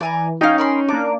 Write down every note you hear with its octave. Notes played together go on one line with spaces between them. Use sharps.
E3 D5 G#5 A#5
C#4 D#4 F5 G5
A#4 B5 C6
A#3 D4 D6